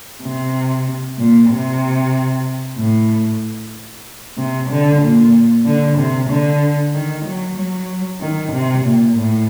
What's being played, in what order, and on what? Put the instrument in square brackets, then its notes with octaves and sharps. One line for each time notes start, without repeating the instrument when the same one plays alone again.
[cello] C3
A#2
C3
A2
C3
D3
A#2
D3
C3
D3
D#3
F#3
F#3
D#3
C3
A#2
A2